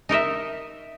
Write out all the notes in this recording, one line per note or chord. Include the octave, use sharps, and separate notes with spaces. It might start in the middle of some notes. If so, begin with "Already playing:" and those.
D#4 A#4 D#5 E5